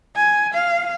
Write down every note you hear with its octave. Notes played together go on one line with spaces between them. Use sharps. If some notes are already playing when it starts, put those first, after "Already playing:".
G#5
F5